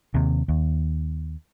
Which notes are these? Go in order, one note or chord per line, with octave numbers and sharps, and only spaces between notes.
D#2 C3
D#2